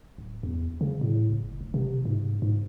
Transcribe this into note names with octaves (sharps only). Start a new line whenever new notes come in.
D1
E2
C#3
A2
F#1
F1
C3
G#2
G#2